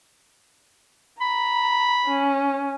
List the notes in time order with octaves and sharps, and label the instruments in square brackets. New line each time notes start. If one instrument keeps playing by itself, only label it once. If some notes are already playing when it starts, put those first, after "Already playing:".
[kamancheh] A#5 [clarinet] B5
[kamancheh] C#4